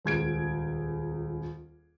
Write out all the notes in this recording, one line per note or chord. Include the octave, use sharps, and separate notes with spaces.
D#1 C#2 G#6 D7